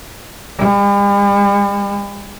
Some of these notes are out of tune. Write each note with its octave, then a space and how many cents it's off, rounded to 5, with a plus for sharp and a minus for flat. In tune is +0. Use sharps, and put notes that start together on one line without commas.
G3 +45